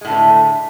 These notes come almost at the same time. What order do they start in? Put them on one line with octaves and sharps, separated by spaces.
G#3 A2 D3 B3 A3